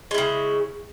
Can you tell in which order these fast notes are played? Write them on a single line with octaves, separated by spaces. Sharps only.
G#3 E4 C#3